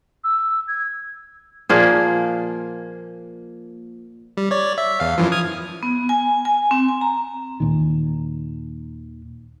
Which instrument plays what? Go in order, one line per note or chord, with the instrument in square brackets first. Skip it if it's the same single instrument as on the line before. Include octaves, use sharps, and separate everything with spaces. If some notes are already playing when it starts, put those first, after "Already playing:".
[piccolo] E6
G#6
[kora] A#2 F3 A#3 G#4
[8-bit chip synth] G3
C#5 D5
E5
E2 F5
F#2 E3 F3
D#6 F6 G#6
[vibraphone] B3
G#5
G#5
C4
G#5
A#5
[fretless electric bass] D#2 A#2 D#3